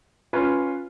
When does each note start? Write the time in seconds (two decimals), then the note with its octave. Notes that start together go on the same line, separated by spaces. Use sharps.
0.33 C#4 F4 B4